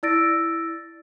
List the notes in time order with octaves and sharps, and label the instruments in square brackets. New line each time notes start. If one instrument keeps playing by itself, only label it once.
[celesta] E4 D5 E6 A6 A#6 D7